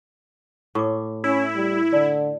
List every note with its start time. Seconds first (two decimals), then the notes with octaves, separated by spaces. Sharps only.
0.75 A2 C#6 D6
1.24 C#4 E4
1.55 G3
1.93 D3 D5 A5